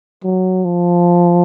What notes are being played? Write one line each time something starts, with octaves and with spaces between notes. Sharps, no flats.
F#3
F3